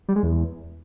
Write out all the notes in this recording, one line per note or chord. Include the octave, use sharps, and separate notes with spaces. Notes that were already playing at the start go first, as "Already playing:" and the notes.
G3
G#3
E2